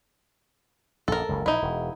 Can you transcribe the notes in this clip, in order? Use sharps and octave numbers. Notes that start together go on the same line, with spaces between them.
A#1 F#2 A4 A#4
F#1 C#2
A#1 D#4 E4
E1